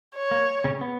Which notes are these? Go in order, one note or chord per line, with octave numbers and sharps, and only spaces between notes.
C#5
A#3
C#3 C#4
B3